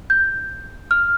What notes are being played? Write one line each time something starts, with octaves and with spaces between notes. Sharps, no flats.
G6
F6